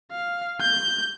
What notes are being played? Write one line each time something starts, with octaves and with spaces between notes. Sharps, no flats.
F5
G6